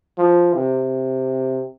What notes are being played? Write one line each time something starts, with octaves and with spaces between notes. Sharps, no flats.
F3
C3